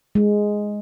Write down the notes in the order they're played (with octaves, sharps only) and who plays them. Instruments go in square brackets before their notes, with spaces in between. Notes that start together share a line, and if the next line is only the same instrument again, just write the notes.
[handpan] G#3